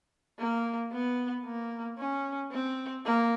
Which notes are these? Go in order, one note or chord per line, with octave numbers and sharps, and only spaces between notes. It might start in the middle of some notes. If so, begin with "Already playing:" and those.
A#3
B3
A#3
C#4
C4
A#3